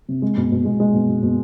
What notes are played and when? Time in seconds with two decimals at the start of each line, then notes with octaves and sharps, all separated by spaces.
0.08 C3
0.22 G#3
0.37 B2
0.51 B2
0.65 G#3
0.80 G#3
0.95 B2
1.09 B2
1.23 B2